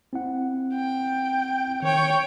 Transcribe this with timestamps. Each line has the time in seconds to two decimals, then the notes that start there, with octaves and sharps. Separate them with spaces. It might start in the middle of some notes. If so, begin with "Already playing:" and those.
0.13 C4 E4 F#5
0.74 G5
1.82 D#3 C#5 G5